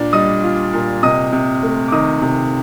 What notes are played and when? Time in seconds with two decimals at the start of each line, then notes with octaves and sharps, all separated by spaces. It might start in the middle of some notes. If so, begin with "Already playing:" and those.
Already playing: A#2 D4 D5
0.13 G3 D#5 D#6
0.43 F4
0.73 A#2
1.03 C3 D#5 D#6
1.32 C3
1.63 A3
1.88 D6
1.92 D#3 D#5 D#6
2.22 C3